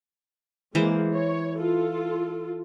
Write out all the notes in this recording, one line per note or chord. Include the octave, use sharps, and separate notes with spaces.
E3 G#3 A#3 C5
C#5
F4 A4